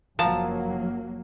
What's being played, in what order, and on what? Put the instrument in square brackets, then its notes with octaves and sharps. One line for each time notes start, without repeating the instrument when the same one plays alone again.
[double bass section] F#1 F#3 A#3 [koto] F3 A5 A#5